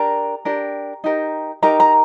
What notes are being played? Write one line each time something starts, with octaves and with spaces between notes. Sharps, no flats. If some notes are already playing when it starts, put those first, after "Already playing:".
Already playing: D4 G4 A#4 A#5
D4 G4 A#4
D#4 G4 A#4
D#4 G4 A#4 A#5
A#5